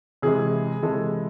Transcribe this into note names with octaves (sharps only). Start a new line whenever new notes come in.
C3 E3 G#3 G#4
C3 E3 G#3 A4